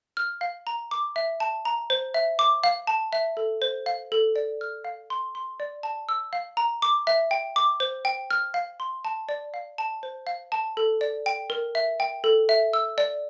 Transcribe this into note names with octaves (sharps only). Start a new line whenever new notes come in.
F6
F5
A#5
D6
E5
A5
A#5
C5
E5
D6
F5
A5
E5
A4
C5
F5
A4
D5
F6
F5
C6
C6
D5
A5
E6
F5
A#5
D6
E5
G5
D6
C5
G5
F6
F5
C6
A5
D5
F5
A5
C5
F5
A5
A4
D5
G5
A#4
E5
G5
A4
E5
E6
D5